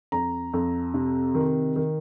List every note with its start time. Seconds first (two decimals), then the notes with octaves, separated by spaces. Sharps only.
0.12 F2 A#5
0.54 F2
0.94 C3
1.35 D#3
1.76 D#3